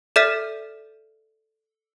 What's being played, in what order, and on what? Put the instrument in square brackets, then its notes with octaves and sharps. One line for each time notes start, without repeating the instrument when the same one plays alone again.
[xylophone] A4 D5 E5 F6 B6 D#7